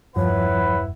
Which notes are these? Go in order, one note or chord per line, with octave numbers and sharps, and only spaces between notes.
E1 G2 F3 E4 B4 C#5 F#5